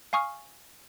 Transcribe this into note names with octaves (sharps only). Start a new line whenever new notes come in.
F5 G#5 C#6 D#6 F6